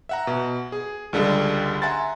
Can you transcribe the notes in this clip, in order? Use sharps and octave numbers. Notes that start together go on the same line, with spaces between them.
E5 F#5 A#5
B2
G#4
C#2 D3 G3 G#3 A4
E5 F#5 G#5 A#5 C6 A6